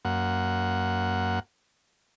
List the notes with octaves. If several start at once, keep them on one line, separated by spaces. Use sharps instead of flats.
F#2 A#3 F#5